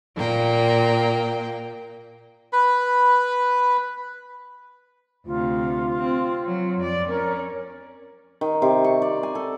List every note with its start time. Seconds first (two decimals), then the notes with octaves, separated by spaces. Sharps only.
0.16 A#2 A#3 G5
2.53 B4 B5
5.26 D2 C3 F4
5.97 C4
6.44 F#3
6.77 F2 D5
7.08 C#4 A#4
8.41 D#3
8.62 C3
8.84 C#6
9.02 D5
9.23 G#5
9.35 A4